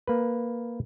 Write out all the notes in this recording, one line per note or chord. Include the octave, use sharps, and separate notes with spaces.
A#3 B4